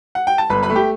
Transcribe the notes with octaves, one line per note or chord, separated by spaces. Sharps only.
F#5
G5
A5
G1 B4 B5
B4 B5
A3
G4 G5